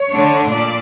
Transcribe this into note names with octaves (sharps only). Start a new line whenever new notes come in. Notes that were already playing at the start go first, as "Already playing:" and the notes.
Already playing: C#5
D3 A3 D4
A#2 D5